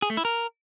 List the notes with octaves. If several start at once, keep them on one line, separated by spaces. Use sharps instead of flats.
G#4
A3
E4
A#4